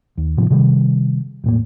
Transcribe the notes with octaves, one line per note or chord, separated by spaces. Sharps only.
D#2
A2 C3 D#3 F3
C3 D#3 F#3 G3
E1 A2 A#3